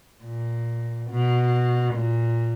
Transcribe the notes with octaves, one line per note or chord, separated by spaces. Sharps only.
A#2
B2
A#2